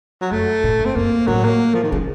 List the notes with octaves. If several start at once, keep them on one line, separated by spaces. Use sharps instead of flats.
F#3
F#2 A3
A2
F#2
C4
F#2 A#3
A2 F#3
A#3
F3
D#3
C#3 F3